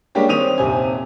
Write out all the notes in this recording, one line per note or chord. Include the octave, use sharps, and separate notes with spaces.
G3 G#3 A#3 D4 G4 C#5
D#3 C4 C#5 D#6 D#7 F7
D#1 C3 C5 G#5